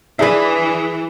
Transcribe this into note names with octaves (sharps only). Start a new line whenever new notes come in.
E3 D4 G#4 B4 E5